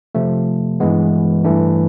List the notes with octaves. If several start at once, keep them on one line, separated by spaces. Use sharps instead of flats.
C3 F3 A3
G2 E3 G#3 B3
G2 E3 A3 D4